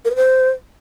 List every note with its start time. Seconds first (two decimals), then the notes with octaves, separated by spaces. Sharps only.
0.05 A#4
0.10 B4
0.16 C5